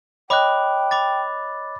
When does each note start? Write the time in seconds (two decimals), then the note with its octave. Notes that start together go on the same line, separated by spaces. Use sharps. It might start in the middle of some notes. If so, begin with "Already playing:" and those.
0.30 C#5 D#5 G5 B5 D6 F#6
0.91 B5 D6 A6